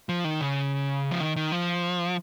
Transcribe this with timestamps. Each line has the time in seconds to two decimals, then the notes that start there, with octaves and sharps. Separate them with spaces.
0.09 F3
0.25 D#3
0.41 C#3
1.11 F3
1.20 D#3
1.36 D#3
1.52 F3